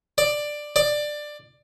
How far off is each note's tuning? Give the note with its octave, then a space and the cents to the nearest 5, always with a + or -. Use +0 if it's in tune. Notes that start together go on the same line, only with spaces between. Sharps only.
D5 +10
D5 +15